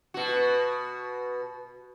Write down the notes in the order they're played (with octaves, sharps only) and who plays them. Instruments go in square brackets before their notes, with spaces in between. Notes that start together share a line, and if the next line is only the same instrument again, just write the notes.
[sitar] B2 F#4